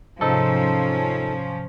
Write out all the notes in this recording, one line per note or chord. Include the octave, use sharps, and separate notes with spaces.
G#2 C3 F3 C#4 D#4 A4